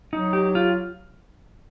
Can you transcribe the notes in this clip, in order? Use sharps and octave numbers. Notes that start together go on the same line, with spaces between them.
F#3 D#4
G4
F4